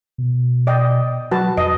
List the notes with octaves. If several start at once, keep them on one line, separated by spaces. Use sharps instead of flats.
B2
D5 D#5 G5
F#3 F#4 B4 A5
F2 D#5